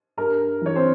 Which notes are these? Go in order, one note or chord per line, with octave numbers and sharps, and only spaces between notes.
G2 A#4 A#5
E3 C#5
C4 C5